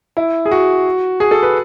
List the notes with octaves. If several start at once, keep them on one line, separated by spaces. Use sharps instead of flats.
E4
G#4
F#4
G#4
A4
B4